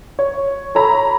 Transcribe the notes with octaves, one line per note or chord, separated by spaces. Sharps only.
C#5
A4 C#5 A#5 B5